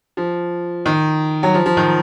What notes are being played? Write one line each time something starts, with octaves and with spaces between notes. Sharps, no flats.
F3
D#3
F#3
F3
F3
D#3